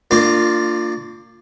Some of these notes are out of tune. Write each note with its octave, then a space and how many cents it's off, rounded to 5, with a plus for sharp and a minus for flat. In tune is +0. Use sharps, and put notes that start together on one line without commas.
A#3 -30 D4 +20 F4 +0